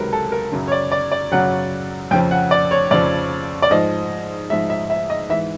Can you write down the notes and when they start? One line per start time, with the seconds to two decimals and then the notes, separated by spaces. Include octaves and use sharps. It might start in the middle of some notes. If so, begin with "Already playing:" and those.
Already playing: C#2 C3 D#3 F#3 A#4 B4
0.13 A4
0.32 A#4
0.52 F#2 C#3 F#3
0.68 C#5
0.72 D5
0.92 D5
1.12 D5
1.32 F#2 C#3 F#3 F#5
2.11 F2 C#3 F3 G5
2.31 F#5
2.51 D5
2.71 C#5
2.91 F2 C#3 F3 D5
3.62 D5
3.71 G#2 F3 D#5
4.50 G#2 F3 E5
4.70 E5
4.90 E5
5.10 D#5
5.29 G#2 E3 E5